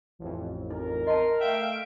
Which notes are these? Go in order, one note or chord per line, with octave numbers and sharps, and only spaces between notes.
A1 F2
D#4 A#4
D#5 A5 C6
A3 E5 F5 G5 D7